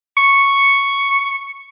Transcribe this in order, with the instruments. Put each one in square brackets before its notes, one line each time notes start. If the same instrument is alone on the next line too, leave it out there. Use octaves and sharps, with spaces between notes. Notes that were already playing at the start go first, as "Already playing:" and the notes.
[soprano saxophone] C#6